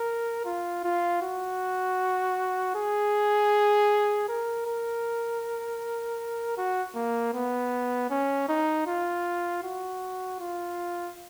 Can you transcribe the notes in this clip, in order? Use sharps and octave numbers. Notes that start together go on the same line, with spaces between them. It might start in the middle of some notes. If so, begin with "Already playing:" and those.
Already playing: A#4
F4
F4
F#4
G#4
A#4
A#4
F#4
A#3
B3
C#4
D#4
F4
F#4
F4